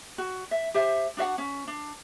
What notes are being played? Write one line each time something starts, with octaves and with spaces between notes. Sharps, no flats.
F#4
E5
G4 C5 E5
D4 F#4 E5 F#5
C#4
D4